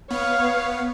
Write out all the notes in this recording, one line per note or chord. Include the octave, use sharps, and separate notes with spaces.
B3 C#5 F5